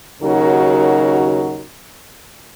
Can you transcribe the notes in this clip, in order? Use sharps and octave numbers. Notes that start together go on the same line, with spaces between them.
D#2 C#3 F#3 D#4 F#4 A#4